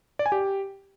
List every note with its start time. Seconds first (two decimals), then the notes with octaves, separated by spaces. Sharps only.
0.19 D5
0.26 G#5
0.32 G4